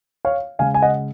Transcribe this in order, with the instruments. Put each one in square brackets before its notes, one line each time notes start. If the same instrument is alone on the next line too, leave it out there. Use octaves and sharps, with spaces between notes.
[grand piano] C#5 F5
C#3 G#3 F5 G#5
G#5
D#5 F#5